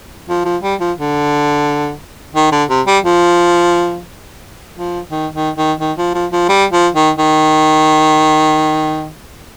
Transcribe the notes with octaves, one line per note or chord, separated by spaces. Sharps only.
F3
F3
G3
F3
D3
D#3
D3
C3
G3
F3
F3
D#3
D#3
D#3
D#3
F3
F3
F3
G3
F3
D#3
D#3